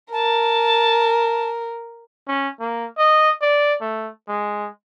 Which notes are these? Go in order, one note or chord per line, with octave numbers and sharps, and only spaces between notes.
A#4 A5
C#4
A#3
D#5
D5
A3
G#3